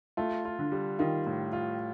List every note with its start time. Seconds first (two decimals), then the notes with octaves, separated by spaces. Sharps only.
0.17 A3 F4
0.45 F4
0.59 D3
0.72 G3
0.99 D#3 F4
1.26 A2
1.53 F4